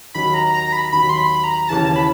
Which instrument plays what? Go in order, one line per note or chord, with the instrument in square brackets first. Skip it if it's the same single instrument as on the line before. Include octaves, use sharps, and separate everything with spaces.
[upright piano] D#2 D#3 F#3 [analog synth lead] B5
[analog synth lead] A#5
A#5
B5
[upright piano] D#2 D#3 F#3 [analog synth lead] B5
[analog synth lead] C6
B5
A#5
[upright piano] D#2 C#3 E3 [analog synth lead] A5
[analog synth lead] B5